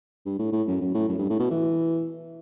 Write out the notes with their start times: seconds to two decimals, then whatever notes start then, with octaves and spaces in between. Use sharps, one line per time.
0.26 G2
0.39 A2
0.52 A2
0.67 F#2
0.81 F#2
0.94 A2
1.09 F#2
1.18 G2
1.30 A2
1.39 B2
1.50 E3